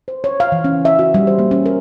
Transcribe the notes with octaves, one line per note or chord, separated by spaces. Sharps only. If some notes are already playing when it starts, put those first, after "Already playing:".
C5
C#5
F5
E3
C#4
E5
F#4
G3
C5
A#3
C#4
A#4